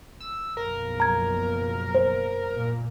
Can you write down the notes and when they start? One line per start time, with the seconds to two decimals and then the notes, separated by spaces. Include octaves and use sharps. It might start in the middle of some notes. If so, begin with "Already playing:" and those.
0.20 E6
0.57 F#1 B1 F3 A#4
1.00 A#5 G#6
1.95 C5
2.55 A#2